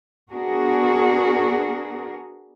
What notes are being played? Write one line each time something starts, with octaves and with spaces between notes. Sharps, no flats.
B3 D4 F#4 G#4 A#4